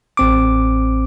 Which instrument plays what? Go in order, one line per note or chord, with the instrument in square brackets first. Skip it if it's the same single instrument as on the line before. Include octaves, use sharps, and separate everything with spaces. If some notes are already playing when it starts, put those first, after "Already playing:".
[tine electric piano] A1 C4 D6